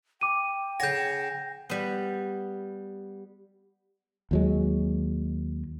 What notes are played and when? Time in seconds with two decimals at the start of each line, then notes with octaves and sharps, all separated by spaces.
0.21 G5 D6 D#7
0.80 C#3 C#5 F#5 G6 A#6
1.70 G3 B3
4.31 D#2 F#3 G#3